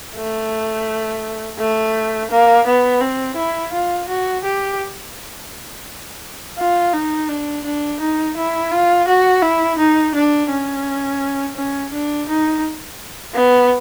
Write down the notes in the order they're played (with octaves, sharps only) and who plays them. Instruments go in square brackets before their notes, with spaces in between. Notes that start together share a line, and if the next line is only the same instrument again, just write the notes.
[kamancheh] A3
A3
A#3
B3
C4
E4
F4
F#4
G4
F4
D#4
D4
D4
D#4
E4
F4
F#4
E4
D#4
D4
C#4
C#4
D4
D#4
B3